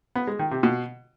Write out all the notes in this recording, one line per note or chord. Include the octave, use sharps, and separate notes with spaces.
B3
G#3
D#3
C3
B2